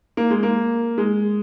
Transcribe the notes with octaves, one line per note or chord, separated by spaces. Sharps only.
A#3
G#3
A#3
G#3